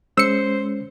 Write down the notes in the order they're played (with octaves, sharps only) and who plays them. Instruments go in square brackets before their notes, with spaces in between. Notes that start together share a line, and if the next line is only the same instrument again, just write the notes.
[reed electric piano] G#3 C#4 [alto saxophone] C5 [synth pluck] E6 C#7